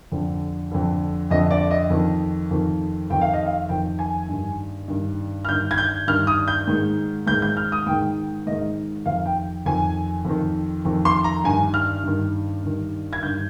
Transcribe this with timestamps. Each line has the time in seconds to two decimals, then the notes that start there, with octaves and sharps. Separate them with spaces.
0.12 F2 D3
0.72 F2 D3
1.31 F2 D3 D#5
1.51 D5
1.71 D#5
1.90 F2 D#3
2.51 F2 D#3
3.10 F2 D#3 G5
3.21 F5
3.33 D#5
3.46 F5
3.69 F2 D#3 G5
3.99 G#5
4.29 G2 D#3
4.88 G2 D#3
5.45 F6
5.48 G2 D#3 G6
5.71 G#6
5.78 G6
6.07 G2 D#3 F6
6.27 D#6
6.48 G6
6.68 G#2 D#3
7.27 G#2 G6
7.30 D#3
7.42 G6
7.57 F6
7.72 D#6
7.86 G#2 D#3 G5
8.47 G#2 D#3 D#5
9.06 F2 D#3 F5
9.25 G5
9.66 F2 D#3 G#5
10.25 F2 D#3
10.85 F2 D#3
11.05 C6
11.24 A#5
11.44 G2 D#3 G#5
11.74 F6
12.03 G2 D#3
12.64 G2 D#3
13.13 G#6
13.23 G2 D#3 G6